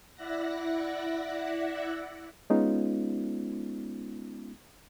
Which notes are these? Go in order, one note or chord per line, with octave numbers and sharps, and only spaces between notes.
E4 D5 E5 F#5 F#6 A#6
G#3 B3 C#4 D#4 F4